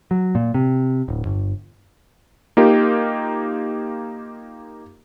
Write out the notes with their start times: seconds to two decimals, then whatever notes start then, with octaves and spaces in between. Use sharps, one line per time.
0.11 F#3
0.35 A#2
0.54 C3
1.08 D1
1.26 G1
2.57 A#3 D#4 F4 G4 A#4